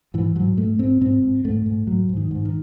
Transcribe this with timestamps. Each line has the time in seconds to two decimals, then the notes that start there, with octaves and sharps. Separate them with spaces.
0.14 G#2 E3
0.36 G#2 F#3
0.57 G#2 A3
0.79 G#2 C4
1.01 G#2 C4
1.23 G#2
1.45 G#2 A3
1.66 G#2
1.87 G#2 F#3
2.09 G#2
2.17 D#3
2.31 G#2
2.45 D#3